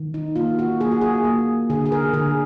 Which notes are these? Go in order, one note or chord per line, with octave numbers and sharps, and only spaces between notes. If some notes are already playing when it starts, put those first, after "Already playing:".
Already playing: D#3
D#4
A#3 F4
F#4
A#3 G#4
F#4
G#4
A#3
D3 G#4
G#4
A#4
D3 G#4